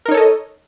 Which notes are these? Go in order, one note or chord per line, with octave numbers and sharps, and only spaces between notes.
D#4 A4 A#4 C#5 D#5